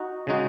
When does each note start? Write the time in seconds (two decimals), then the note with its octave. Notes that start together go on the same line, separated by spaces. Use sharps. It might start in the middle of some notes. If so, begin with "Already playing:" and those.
Already playing: D#4 F#4
0.27 C#3 G#3 D#4 F#4